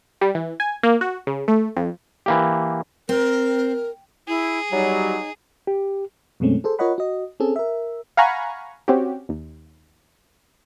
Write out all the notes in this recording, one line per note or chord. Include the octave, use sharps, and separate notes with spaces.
G3
E3
G#5
A#3
F#4
C#3
A3
F2
E3 A#3 G4
C4 A#4
E4 G#4
F#3 G3 D#4
G4
F#2 B2 G#3 A3 C4 C#4
G#4 A4 C5
F4 A#4 C#5 D#5 F#5 B5
F#4 D#5
C4 C#4 G#4 A4
A#4 E5
F5 F#5 G#5 A#5 B5 C#6
C4 C#4 F#4 G4
D#2